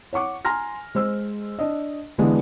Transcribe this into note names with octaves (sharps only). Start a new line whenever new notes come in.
C#5 F#5 C#6 D6
G#5 A#5 C6 F6 A#6
G#3 C5 E6
D4 D#5
D3 E3 G#3 B3 D4